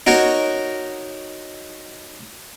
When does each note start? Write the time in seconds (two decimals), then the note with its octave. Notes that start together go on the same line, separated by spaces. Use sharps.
0.07 D#4 F#4 A#4 C#5